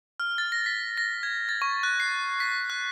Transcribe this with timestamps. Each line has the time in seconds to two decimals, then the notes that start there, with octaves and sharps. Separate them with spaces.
0.20 F6
0.38 A6
0.52 A#6
0.66 B6
0.98 A#6
1.23 G#6
1.49 A6
1.62 C#6
1.83 F#6
2.00 C7
2.40 B6
2.70 F#6